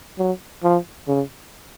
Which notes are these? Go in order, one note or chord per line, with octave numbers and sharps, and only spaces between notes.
F#3
F3
C#3